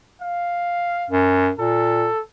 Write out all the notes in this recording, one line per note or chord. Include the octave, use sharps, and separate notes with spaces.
F5
F#2
A#2 A4